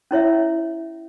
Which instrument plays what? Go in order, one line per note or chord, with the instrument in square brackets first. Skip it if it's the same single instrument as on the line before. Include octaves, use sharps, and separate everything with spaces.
[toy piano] C#4 E4 C#5 E5